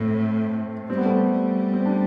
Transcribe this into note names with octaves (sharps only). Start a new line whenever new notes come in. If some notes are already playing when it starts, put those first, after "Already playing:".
Already playing: A2 A3 C4
G3 C4
B3
A3 C4
G3
C4
D4